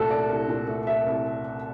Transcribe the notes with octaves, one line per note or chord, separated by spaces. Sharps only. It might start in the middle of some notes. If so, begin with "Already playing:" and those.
Already playing: C2 A#2 A3 F#4 A4
F#3 D5
C2
A#2
A3
F#3 E5
C2